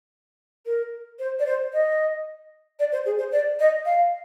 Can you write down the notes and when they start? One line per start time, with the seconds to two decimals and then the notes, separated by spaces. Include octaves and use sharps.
0.66 A#4
1.19 C5
1.39 D5
1.46 C5
1.73 D#5
2.79 D5
2.92 C5
3.06 G#4
3.19 C5
3.32 D5
3.60 D#5
3.85 F5